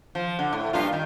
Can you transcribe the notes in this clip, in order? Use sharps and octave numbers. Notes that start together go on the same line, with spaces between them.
F3
D3
A2
G2 A#2 F4
D#3